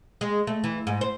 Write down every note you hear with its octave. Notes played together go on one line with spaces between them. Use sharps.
G#3
A3
E3
G#2
C5